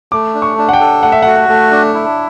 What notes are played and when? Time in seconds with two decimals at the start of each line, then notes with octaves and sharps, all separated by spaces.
0.12 A3 D6
0.35 D4
0.42 C#6
0.58 D4
0.69 F#5
0.73 G5
0.80 A4
1.03 A3 F#5
1.12 E5
1.22 F#4 F#5
1.49 A3
1.71 D4
1.94 E4